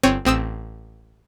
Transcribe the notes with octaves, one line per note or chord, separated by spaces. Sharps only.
G1 C4 C#5 D#7
A1 C4 D#6 E6 E7